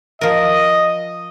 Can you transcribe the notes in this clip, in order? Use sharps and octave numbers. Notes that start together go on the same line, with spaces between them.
F3 A#4 D#5